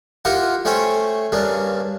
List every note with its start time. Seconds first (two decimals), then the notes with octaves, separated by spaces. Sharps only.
0.25 E4 F4 G4 A#4 F#5
0.65 A3 C#4 C5 C#5 G5
1.32 G2 C#3 A#3 D4